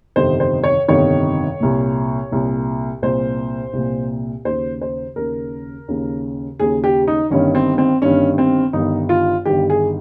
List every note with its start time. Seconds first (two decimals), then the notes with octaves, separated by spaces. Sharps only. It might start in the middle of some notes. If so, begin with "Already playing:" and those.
0.16 G1 F2 C3 D#3 C5
0.40 C5
0.64 C#5
0.88 G1 F2 C3 D#3 C#5
1.60 C2 A#2
2.31 C2 A#2
3.02 C2 A#2 C5
3.73 C2 A#2
4.45 D#2 C#3 C5
4.81 C5
5.16 D#2 C#3 A#4
5.88 D#2 C#3
6.59 D#2 C#3 G#4
6.84 G4
7.08 D#4
7.30 G1 G2 D#3 C#4
7.55 C4
7.78 C4
8.02 G1 G2 D#3 C#4
8.38 C4
8.73 G1 G2 D#3 D#4
9.09 F4
9.45 G1 G2 D#3 G4
9.70 G#4